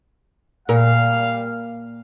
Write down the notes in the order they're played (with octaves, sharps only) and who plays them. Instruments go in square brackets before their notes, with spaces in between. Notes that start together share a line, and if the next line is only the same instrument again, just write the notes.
[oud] A#2 A#4 [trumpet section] G3 F5